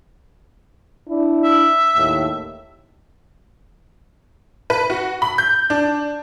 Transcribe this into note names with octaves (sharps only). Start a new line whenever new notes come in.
D4 E4
E5
D#2 A2
B4
F#4
B5
G6
D4